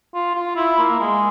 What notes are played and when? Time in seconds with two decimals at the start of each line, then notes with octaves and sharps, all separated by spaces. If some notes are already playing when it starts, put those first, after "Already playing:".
0.14 F4
0.35 F4
0.56 E4
0.78 A#3
1.00 G#3